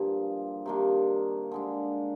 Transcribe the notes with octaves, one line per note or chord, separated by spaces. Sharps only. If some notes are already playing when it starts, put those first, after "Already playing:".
Already playing: G2 D3 F3 A#3 C4 G#4
C3 D#3 A#3 D4
D3 G#3 D4